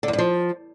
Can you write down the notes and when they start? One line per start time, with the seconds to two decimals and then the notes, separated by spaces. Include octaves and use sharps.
0.03 D3
0.08 E2
0.13 G2
0.18 F3